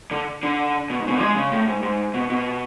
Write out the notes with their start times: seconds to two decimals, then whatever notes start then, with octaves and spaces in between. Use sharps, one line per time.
0.11 D3
0.43 D3
0.90 B2
1.00 G#2
1.07 C#3
1.10 B2
1.21 G#3
1.36 C#3
1.52 A2
1.67 G#2
1.83 G#2
2.14 B2
2.30 B2